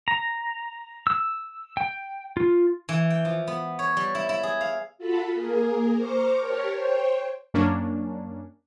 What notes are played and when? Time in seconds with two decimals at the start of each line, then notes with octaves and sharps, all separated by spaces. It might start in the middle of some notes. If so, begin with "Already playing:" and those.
0.08 A#5
1.07 E6
1.77 G5
2.37 F4
2.89 E3
3.10 G5
3.25 F3
3.47 B3
3.79 C#5
3.97 G3
4.15 E4
4.29 E4
4.43 G#4
4.61 F5
4.98 F4 F#4 A4 A5 B5
5.34 A#3 G#4 A#4
5.95 C5 A#5 C#6 D6 F6
6.37 G4 A#4 C#5 A5 C#6 F6
6.74 C5 C#5 G5
7.54 F#2 A#3 C#4 D4